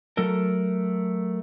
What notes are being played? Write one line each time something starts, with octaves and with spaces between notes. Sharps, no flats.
F#3 A3 A4 A#4